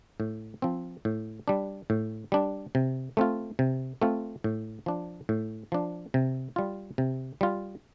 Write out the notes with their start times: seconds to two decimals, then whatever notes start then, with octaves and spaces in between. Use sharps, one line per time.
0.20 A2
0.62 F3 C4
1.05 A2
1.48 G3 D4
1.90 A2
2.32 G3 D4
2.75 C3
3.17 A3 C4 F4
3.59 C3
4.02 A3 C4 F4
4.44 A2
4.86 F3 D4
5.29 A2
5.72 F3 D4
6.14 C3
6.56 G3 F4
6.98 C3
7.41 G3 F4